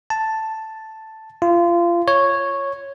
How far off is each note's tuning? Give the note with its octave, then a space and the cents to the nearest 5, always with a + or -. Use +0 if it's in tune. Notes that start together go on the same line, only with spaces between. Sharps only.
A5 +0
F4 -25
C#5 -5